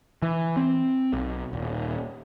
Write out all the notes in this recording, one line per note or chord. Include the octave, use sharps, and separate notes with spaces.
E3
C4
B1
D#1